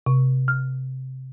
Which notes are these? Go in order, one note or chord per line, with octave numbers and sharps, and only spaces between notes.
C3
F6